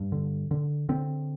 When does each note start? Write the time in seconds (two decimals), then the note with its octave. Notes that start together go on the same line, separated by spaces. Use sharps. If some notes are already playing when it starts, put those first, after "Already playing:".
Already playing: G2
0.12 D3
0.51 D3
0.89 D3 C4